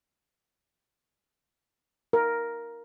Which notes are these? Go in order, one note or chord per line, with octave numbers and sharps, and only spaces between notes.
A#4